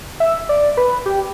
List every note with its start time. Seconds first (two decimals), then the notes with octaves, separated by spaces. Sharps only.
0.20 E5
0.49 D5
0.77 B4
1.06 G4